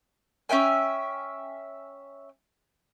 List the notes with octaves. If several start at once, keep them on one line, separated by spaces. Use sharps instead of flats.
C#4 E5 G5 G#5